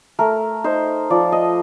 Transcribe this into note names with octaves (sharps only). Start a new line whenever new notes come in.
A3 A#4
D#4 C5
F3 D5
D#5